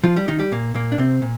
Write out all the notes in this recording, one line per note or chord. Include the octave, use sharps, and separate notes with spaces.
F3 F4
G3 G4
D#3 D#4
G3 G4
A#2 A#3
A#2 A#3
D4
C3 C4
A#2